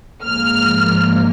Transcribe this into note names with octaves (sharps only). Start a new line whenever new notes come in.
G#2 F3 A#3 F6